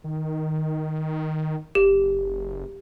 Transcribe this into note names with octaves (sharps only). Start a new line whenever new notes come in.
D#3
F#1 G4